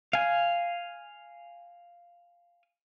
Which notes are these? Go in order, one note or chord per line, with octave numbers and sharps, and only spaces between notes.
F5 G#5